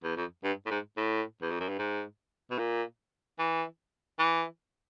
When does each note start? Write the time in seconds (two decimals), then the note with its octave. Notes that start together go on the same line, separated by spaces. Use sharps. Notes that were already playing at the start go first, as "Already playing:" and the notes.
0.04 E2
0.17 F2
0.44 G2
0.66 A2
0.71 G#2
0.97 A2
1.42 E2
1.51 F2
1.60 F#2
1.69 G2
1.79 G#2
2.51 B2
2.58 A#2
3.39 E3
4.19 E3